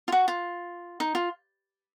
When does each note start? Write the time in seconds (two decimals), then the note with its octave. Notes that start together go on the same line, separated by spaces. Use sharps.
0.08 F4
0.12 F#4
0.28 F4
1.00 D#4
1.15 F4